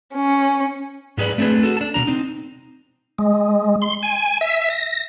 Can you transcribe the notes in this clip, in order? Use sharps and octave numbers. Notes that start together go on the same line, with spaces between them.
C#4
G#2 G4 G#4 B4 D5
A3 C4 D4 F4 G#4 B4
F#4 A4
D4 A5
B2 E3 D4 A#5
C4 D#4
G#3
C6
G#5
E5
A#6